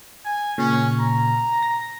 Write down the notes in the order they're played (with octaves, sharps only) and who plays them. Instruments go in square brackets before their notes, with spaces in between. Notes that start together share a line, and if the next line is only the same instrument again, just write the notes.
[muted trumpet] G#5
[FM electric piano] A#2 C#3 [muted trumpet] C#4
[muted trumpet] A#5
[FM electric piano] A#6